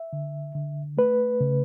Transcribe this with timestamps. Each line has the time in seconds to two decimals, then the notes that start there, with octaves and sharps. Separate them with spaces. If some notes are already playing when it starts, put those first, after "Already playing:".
Already playing: E5
0.13 D3
0.55 D3
0.97 A3 B4
1.41 C#3